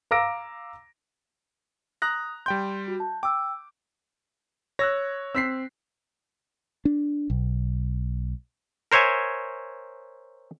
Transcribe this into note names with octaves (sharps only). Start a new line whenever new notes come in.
F5 A#5 D6 E6 A#6 D7
A#5 D#6 F#6 A#6
G3 G5 C6 G6
F#4
A5
G5 D6 E6
C#5 E6 F#6 A#6
C4 E6 B6 C7
D4
B1
A#4 C5 C#5 E5 G#5